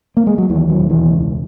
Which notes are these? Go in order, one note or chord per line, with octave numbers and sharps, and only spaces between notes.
A#3
G#3
F#3
D#2 E3
F#3
E1
E3
C#2